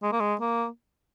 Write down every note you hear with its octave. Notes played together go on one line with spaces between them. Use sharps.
G#3
A#3
G#3
A#3